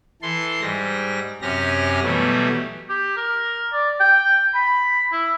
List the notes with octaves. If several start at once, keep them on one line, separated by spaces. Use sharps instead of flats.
E3 A4 C6
G#2 G3 A#6
F#2 C3 C#4 G4 F6 A#6
B2 E3 F#3 G3 A3
G4
A#4
D5
G5
B5
E4